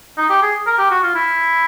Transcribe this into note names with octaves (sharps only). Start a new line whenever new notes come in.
D#4
G4
G#4
A#4
G4
F#4
F4
E4